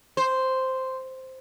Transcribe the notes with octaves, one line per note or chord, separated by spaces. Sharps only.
C5